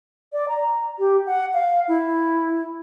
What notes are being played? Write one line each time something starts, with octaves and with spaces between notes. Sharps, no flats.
D5
A#5
G4
F#5
F5
E4